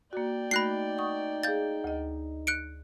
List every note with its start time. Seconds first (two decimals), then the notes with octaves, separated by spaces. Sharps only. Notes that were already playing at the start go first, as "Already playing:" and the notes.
0.13 A#3 F#4 D5 G5
0.51 A3 D#4 F#4 B5 F#6 A#6 C7
0.98 F#5 C#6 D#6
1.43 G#4 F5 G6 A6
1.84 D2 D#5
2.47 F#6 C#7 D7